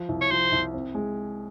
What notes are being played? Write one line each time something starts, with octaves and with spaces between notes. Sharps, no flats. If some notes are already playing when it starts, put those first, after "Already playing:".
Already playing: F3
C2
C#5
F3 C5
C2
C4
G#3